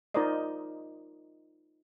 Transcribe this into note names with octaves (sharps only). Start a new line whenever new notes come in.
D#4 F4 A#4 C5 D5 D#5